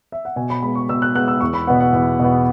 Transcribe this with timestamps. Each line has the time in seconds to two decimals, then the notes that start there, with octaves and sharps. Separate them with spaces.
0.12 E5
0.25 F#5
0.36 B2 G#5
0.50 B5
0.62 G#3 B3 B5
0.75 C#6
0.89 B2 E6
1.02 F#6
1.15 G#3 B3 F#6
1.28 E6
1.41 E2 C#6
1.54 B5
1.67 B2 B3 F#5
1.80 F#5
1.93 E2
2.19 B2 B3